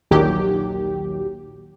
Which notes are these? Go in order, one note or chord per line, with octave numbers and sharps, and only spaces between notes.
A#1 D#2 A#2 D#3 F#3 G4